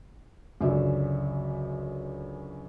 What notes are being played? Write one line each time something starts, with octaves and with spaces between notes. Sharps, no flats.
C#2 F#2 D3 D5 E5